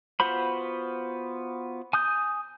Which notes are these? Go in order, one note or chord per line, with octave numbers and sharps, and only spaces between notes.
B3 F4 F#4 C5 B5
G#5 D#6 G6